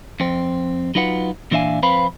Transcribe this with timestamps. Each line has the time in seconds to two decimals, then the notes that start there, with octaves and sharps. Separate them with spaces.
0.20 F2 C4
0.95 F#3 D#4 F4 B4 F#5
1.51 A#2 E3 D4 E5 F5 G#5
1.83 F2 C4 B4 F5 B5